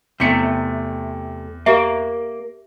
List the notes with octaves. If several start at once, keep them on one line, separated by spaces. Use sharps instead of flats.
E2 C3 A3 C#7
A#3 G4 E5